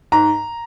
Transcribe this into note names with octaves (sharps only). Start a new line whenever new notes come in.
G#2 A#5